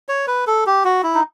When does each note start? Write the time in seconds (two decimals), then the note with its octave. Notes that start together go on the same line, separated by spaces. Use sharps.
0.09 C#5
0.27 B4
0.47 A4
0.66 G4
0.85 F#4
1.03 E4
1.14 D#4